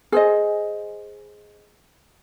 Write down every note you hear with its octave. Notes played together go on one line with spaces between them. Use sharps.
G#4 C5 D#5